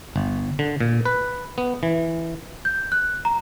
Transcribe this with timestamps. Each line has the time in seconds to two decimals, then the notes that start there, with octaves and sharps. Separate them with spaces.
0.16 G1
0.59 D3
0.81 A#2
1.05 B4
1.58 B3
1.83 E3
2.65 G6
2.92 F#6
3.25 A#5